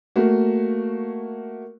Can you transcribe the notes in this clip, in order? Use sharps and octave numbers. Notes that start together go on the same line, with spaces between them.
A3 A#3 F#4